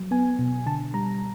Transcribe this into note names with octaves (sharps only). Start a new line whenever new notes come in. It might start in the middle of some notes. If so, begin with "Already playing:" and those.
Already playing: F#3
B3 G#5
B2
D3 A5
G3 A#5